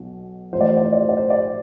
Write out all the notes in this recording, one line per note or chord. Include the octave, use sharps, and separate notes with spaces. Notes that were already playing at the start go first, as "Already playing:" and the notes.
Already playing: B1 B2
A1 A2 F3 C5
D5
C5
D5
C5
D5
C5
D5
C5
D5